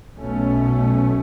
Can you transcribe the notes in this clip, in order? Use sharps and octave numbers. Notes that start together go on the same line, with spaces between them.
B1 B2 A3 C#4